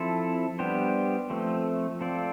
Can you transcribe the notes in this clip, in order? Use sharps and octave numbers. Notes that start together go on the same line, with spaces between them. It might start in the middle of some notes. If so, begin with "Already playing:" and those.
Already playing: F3 C4 E4 A4
G3 B3 D4 G4 C5
F3 A3 C4
C4 F4 A4 D5